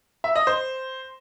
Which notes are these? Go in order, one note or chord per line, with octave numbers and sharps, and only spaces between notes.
E5
D#5
C5